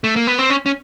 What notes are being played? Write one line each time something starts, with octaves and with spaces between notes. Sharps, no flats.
A3
A#3
B3
C4
C#4
C#4